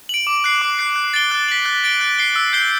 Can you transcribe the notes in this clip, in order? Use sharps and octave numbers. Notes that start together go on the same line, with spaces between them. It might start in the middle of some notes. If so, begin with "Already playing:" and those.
D7 F#7
D6
F#6 C7
D6
F#6 C7
F#6
A6 D7 G7
F#6
B6 F#7
F#6
A6 D7 G7
F#6
C7 G7
E6
G6 C7 G7